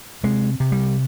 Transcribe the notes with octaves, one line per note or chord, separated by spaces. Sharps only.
C3 G#3
C3
G3